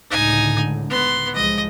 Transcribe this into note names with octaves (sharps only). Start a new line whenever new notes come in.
C#2 A2 D3 D#4 G#5
B3 C6
C2 F3 G#3 D#5